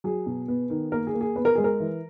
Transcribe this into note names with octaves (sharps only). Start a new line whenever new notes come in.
F#3 G#4
B2
B3
D#3
A#3 A#4
G#4
A#3
G#4
B3 B4
A#4
G#3 G#4
A#4
E3